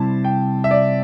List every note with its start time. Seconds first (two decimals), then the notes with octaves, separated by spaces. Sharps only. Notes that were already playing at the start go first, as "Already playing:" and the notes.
Already playing: C3 G3 C4 E4 A5
0.24 G5
0.64 E5
0.71 D5